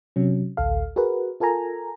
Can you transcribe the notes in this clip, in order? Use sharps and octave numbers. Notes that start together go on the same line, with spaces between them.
C3 F#3 C#4
A1 D2 A4 F5
F#4 G#4 A#4 B4
F4 A4 A#4 G#5 A#5